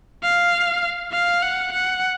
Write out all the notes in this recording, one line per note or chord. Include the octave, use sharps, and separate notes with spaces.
F5
F5
F#5
F#5